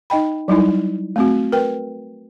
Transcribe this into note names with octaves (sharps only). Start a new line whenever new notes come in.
D#4 D#5 G5 B5
F#3 G3 D#4 E4
A3 C4 F#4
A#4 B4 G5